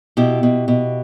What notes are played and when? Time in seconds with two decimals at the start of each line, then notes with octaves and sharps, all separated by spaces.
0.17 B2 E4 G4
0.43 B2
0.68 B2